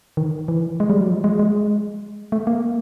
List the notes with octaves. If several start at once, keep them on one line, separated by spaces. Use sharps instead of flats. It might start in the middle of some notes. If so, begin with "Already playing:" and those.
D#3
E3
G#3
G3
F#3
F3
G#3
G#3
A3
A#3